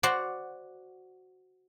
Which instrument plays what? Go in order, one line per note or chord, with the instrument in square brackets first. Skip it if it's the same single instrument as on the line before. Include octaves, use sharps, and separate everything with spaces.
[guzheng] F#4 C5 D5